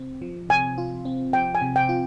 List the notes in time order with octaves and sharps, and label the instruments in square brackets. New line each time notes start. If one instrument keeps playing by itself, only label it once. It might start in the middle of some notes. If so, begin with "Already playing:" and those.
Already playing: [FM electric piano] C3 C4
F3
[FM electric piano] C3 [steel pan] G#5
[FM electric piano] F4
C4
[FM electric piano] F3 [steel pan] G5
[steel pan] G#5
[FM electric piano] C3
[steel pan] G5
[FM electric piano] F4